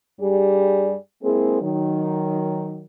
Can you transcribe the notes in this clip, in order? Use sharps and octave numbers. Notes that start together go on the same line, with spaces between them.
G2 G3 G4 G#4 D5
G#3 A#3 C4 E4 G#4
D#3 F#3